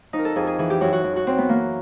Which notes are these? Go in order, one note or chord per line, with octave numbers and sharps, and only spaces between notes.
F2 D#4
A#4
A4
F2 G#4
G#4
E3 G#4
G4
F#2 F#4
F#4
F#2
F#4
F#2 C4
B3
E3 A#3